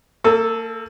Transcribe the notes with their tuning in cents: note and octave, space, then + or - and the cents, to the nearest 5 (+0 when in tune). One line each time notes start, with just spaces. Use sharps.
A#3 -40 A4 +0